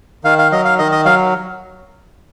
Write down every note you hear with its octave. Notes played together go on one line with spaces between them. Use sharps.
D#3 F5
F5
F#3 D#5
F5
D#3 D#5
D#5
F#3 F5